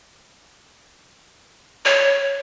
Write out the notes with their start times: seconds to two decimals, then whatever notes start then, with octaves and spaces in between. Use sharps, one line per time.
1.85 C#5